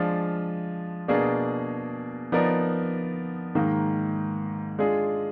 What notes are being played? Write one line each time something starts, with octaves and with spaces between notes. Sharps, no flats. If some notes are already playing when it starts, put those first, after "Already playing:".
Already playing: F3 G#3 D4 F4
B2 A#3 D4 G#4
F3 B3 D#4 A#4 D5
G#2 D#3 A#3
G#3 D4 F4 G#4